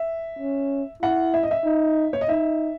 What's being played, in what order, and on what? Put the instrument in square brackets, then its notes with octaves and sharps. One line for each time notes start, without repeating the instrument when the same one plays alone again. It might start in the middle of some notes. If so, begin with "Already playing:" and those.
Already playing: [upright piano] E5
[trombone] C#4
[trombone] E4 [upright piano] F#5
[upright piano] E5
D#5
E5
[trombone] D#4
[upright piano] C#5
D#5
[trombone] D#4 [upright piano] E5